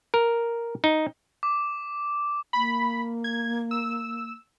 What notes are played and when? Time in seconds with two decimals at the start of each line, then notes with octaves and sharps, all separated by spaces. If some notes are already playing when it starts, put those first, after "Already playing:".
0.14 A#4
0.84 D#4
1.43 D6
2.53 A#3 B5
3.24 G#6
3.71 E6